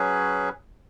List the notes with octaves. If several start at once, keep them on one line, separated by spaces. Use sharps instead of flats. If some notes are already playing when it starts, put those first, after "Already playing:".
Already playing: F#3 C#4 G#4 B4